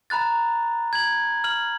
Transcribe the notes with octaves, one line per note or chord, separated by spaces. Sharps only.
A#5 B5 F#6 A6
G#6 F#7
F6 F#7